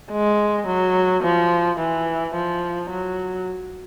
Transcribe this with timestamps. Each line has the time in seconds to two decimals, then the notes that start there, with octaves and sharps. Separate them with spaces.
0.12 G#3
0.67 F#3
1.23 F3
1.79 E3
2.34 F3
2.90 F#3